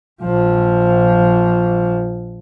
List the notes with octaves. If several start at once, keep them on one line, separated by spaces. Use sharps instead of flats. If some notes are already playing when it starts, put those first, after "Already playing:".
A#1 F3